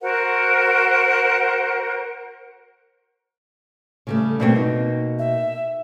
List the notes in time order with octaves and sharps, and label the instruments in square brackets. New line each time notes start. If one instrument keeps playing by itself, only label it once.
[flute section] F#4 A#4 C5 F#5
[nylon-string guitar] C#3 G3 A3
[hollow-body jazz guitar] G2 A3 C4 [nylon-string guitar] B2 A#3
[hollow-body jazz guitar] D#4
[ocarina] E5